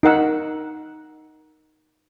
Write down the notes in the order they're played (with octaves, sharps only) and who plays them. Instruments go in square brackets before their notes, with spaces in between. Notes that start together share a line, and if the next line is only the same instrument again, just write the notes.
[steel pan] D#4 A#4 F#5 E6